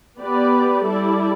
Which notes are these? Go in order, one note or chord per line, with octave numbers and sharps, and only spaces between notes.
B3 G4 B4 D5
G3 E4 A4 D5